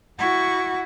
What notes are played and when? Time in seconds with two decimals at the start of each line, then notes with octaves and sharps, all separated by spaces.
0.19 E4 F#4 F#5 C#6